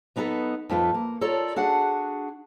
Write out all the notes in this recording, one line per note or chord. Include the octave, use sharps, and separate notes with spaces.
F#3 B3 D#4 G4 A4 B4
F2 A3 F4 B4
A#3
F4 A4 A#4 C#5 D5
D4 F#4 G#4 F#5